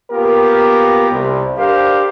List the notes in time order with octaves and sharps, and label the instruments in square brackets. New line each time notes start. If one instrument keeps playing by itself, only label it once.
[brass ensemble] A#3 B3 F4 G4 A#4
C2
D4 G4 A4 A#4 C5 F5